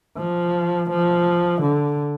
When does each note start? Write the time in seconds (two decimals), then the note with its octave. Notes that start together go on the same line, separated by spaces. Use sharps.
0.17 F3
0.90 F3
1.62 D3